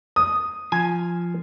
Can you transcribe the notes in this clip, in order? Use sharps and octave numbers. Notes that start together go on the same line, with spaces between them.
D#6
F3 G#5